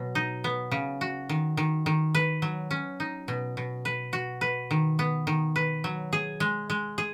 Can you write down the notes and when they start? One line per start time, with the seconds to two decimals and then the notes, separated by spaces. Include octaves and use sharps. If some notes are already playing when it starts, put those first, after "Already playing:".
Already playing: B2 F#3
0.15 D#4
0.44 B3
0.71 C#3
1.01 F#4
1.29 D#3
1.57 D#3
1.86 D#3
2.15 B4
2.42 F#3
2.71 C#4
3.00 D#4
3.28 B2
3.57 B2
3.85 B4
4.13 F#4
4.41 B4
4.71 D#3
4.99 B3
5.27 D#3
5.56 B4
5.84 F#3
6.13 G#4
6.40 G#3
6.70 G#3
6.98 G#4